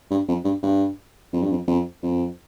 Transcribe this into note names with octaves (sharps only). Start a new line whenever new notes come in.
G2
F2
G2
G2
F2
G2
F2
F2
F2